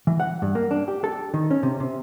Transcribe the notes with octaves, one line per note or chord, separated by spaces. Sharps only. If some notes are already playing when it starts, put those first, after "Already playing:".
E3
F#5
G2
A#3
D4
G4
A4
D#3
C#4
C3
C3